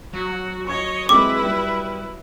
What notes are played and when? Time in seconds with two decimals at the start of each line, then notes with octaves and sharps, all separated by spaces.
0.13 F#3 F#4
0.67 C#5 D#5 C#6 G#6
1.09 G#3 C4 E4 B4 D6
1.43 G3